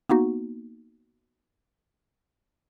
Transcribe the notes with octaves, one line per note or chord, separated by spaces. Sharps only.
A#3 B3 D#4 F#4